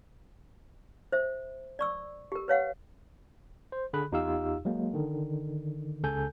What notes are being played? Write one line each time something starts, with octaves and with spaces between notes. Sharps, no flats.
C5 E5
D5 C#6 E6
G4 A#4
B4 C#5 F5 F#5
C5
D3 G#4 B5 F#6
E2 D#4 F4 G4 F5 E6
F#3 G#3 A#3
D3 D#3
C#2 C#3 A4 G#5 G6